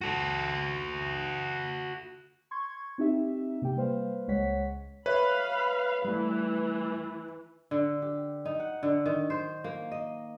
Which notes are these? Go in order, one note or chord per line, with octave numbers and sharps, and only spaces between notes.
F#4 A4
C6 C#6 G#6
C4 D#4 G4 E5
C3 A#3 G4 G5
G3 A#3 B4 C5 F5
C#2 G#3 C#5 F#5 B6
B4 C#5 E5 F5 B5
E3 G3 A3
D3
G4
D#4
F#5
D3
D#3
C5
A#3
D#5